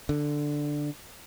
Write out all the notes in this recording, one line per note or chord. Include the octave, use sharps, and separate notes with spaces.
D3